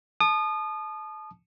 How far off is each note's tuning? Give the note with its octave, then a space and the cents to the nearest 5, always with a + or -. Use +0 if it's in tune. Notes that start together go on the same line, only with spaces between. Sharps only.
A5 -25 D#6 -30